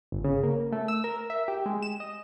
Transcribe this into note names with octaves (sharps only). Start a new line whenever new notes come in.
G1
C#3
A#3
A3
E6
A#4
E5
G4
G#3
E7
D#5